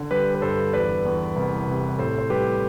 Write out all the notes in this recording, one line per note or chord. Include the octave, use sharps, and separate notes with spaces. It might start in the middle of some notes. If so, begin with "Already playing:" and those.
Already playing: D3
G3 G4 B4
B4
G2 A4 C5
E2 B4 D5
E2
C2
C3
A2 A4 C5
C5
G3 G4 B4